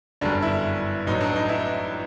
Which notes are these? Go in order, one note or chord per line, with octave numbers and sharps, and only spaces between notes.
G1 F#2 D3 G3 D4
E4
A1 A2 F#3 D#4
D4
D#4
E4